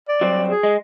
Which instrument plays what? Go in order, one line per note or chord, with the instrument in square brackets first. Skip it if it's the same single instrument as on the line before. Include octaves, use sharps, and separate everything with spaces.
[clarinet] D5
[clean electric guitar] F#3 G3 C4
[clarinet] G#4
[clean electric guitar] G#3